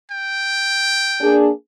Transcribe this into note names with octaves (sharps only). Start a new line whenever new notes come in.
G5
A#3 D4 G#4